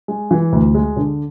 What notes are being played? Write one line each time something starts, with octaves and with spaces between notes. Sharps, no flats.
G#3
E3
D2
G#3
D3